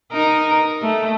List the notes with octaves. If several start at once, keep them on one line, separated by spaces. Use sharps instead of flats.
D#4 A#4
A3